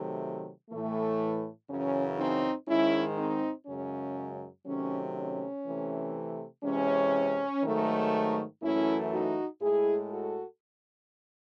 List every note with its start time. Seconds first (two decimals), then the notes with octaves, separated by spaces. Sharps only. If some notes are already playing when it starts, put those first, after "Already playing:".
Already playing: C3 D#3 F#3 A3
0.70 A2 E3 A3
1.68 F#2 C#3 E3 C#4
2.18 C4 D#4
2.67 G#2 D#3 G#3 C#4 E4
3.17 C4 D#4
3.67 F#2 C#3 G#3 C#4
4.66 C3 D#3 F#3 A3 C#4
5.15 C#4
5.65 C3 E3 A3
6.63 C3 E3 G#3 C#4
7.63 G#2 D#3 F#3 A3
8.61 F#2 E3 A3 C#4 E4
9.11 D#4 F#4
9.61 A2 G#3 E4 G#4
10.10 F#4 A4